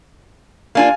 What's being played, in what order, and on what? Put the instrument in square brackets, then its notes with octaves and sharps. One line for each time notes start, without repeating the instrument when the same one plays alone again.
[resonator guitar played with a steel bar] A#3 D4 F4 [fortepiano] F5 G#5